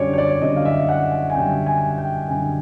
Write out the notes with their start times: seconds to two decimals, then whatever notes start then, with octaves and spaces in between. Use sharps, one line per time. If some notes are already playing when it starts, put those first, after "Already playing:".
Already playing: F#2 D3 G3 C#5 D5
0.13 C#5
0.18 D5
0.42 F#2 D3 G3 D#5
0.56 F5
0.65 E5
0.89 F#5
1.12 F#5
1.30 G#5
1.35 F#2 D3 G3 G5
1.66 G#5
1.98 G5
2.28 F#2 D3 G3 G#5